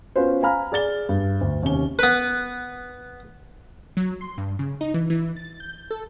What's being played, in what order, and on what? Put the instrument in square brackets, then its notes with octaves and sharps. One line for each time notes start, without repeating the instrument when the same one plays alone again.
[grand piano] B3 C#4 F4 F#4 B4 C5
F5 G#5 A#5 B5 F6
G#4 D5 A6 G7
G2
D2
D#2 C3 C#4 G7
[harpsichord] B3 B4
[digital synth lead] F#3
C6
G2
C#3
D#4
E3
E3
A6
G6
A4